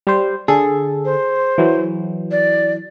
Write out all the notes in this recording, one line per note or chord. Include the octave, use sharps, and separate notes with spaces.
G3 C5
D3 G#4 A4
C5
E3 F#3
D5